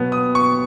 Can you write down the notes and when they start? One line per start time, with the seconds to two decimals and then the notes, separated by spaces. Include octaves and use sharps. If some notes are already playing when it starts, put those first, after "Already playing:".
Already playing: B2 F#3 B3
0.12 D#6
0.35 C#6